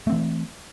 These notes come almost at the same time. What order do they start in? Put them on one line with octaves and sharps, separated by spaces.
A3 C4 E3